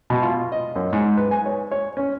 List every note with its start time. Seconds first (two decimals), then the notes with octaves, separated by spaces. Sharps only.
0.10 B2
0.22 F4
0.52 D#5
0.76 F#2
0.93 G#2
1.17 B4
1.31 G#5
1.46 C#5
1.71 C#5
1.97 C#4